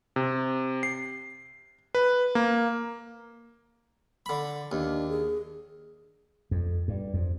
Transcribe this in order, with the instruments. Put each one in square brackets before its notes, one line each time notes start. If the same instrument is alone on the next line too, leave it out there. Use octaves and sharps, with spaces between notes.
[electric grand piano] C3
C7
B4
A#3
[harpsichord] D3 B5
[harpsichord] D#2 [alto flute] D4
[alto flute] G#4
[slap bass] F2
G2
F2